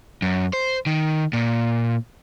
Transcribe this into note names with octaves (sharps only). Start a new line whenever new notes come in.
F#2
C5
D#3
A#2